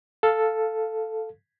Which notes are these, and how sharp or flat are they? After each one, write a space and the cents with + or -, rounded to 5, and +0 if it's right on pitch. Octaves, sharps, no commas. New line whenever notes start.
A4 +0 F5 +0